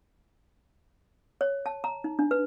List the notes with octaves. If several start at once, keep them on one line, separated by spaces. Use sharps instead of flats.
C#5
A5
A#5
D#4
D4
B4